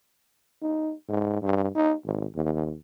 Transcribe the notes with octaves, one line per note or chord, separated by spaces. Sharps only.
D#4
G#2
G2
D#4
G#1
D#2